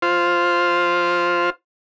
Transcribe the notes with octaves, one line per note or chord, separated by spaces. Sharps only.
F4 C5